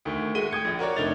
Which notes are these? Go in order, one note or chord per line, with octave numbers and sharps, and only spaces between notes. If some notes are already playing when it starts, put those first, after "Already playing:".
D2 D#3 A3
G#3 A3 F#4 D#7 G7
G5 D#6 G#6 C#7
A#1
F#4 A#4 C#5 D5
F1 A3 D4 D#4 A6 F7